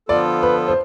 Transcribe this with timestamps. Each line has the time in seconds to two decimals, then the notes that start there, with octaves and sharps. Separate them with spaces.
0.08 D3 F3 B3 F4 A4 D5
0.43 B4
0.68 C5